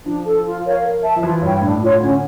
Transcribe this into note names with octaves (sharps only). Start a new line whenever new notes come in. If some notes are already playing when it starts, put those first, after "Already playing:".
F3 D4
F4 A4
F4
A#4 C#5 F5
A#4
E5 A5
F3
E3 F4
G2 C#5 G5
A2 D4
F4 C#5
D3 C#4